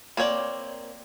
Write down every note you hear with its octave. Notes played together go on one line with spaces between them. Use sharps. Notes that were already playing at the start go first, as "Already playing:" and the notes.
A#3 C4 C#5 D5